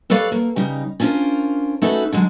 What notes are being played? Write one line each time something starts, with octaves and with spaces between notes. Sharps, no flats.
G3 A4 B4 C#5 D5 F5
A#3
C#3 G3 D#4
C#4 D4 F4 G4 A#4 C5
A3 C#4 D#4 F#4 A4 B4
D3 F#3 G#3